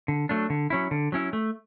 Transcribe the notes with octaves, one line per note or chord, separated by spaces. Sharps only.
D3
F#3 A3 D4
D3
F#3 C#4 E4
D3
F#3 C#4 E4
A3